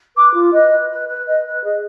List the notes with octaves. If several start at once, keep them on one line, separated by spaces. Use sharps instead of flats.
B4 D6
F4
B4 D#5
B4
B4
B4
B4 D#5
B4
G#4 D#5